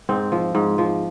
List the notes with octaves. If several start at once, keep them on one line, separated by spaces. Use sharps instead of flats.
G#2 C4
F3
G#2
F3